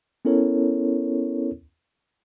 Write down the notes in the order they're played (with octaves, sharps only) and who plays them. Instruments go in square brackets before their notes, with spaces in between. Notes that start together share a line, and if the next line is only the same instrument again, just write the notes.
[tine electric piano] B3 C#4 E4 A4 A#4 C#5